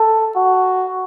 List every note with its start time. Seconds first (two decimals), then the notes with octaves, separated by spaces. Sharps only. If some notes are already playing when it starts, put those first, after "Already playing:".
Already playing: A4
0.36 F#4